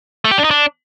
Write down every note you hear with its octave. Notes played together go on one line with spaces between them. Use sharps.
A3
G4
D4
D#4
D4